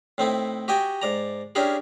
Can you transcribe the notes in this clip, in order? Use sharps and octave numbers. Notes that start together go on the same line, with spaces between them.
A2 C4 D#4 E4
F#4 G4 D#5 G5 G#5
G#2 D5 A#5
C#4 D4 E4 G4 G#4 A#4